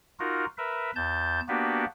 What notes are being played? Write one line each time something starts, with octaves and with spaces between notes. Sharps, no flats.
D#4 F4 F#4 A#4
A#4 B4 E5
E2 A5 G6
A#3 B3 D4 F#4 G4 B4